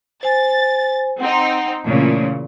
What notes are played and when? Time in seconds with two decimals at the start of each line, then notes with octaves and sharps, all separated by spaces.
0.23 C5 G#5 A6
1.20 C4 D#4 F#5
1.84 A#2 C#3 E3 A3